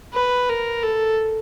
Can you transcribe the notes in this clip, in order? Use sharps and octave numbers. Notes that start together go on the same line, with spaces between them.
B4
A#4
A4